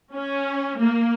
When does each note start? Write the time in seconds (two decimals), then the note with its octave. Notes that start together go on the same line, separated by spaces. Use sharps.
0.15 C#4
0.79 A#3